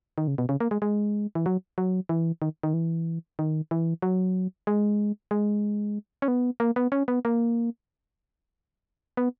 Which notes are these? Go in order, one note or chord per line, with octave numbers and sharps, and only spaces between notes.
D#3
C#3
B2
C#3
A#3
G#3
G#3
E3
F#3
F#3
E3
D#3
D#3
E3
D#3
E3
F#3
G#3
G#3
C#4
B3
A#3
B3
C#4
B3
A#3
B3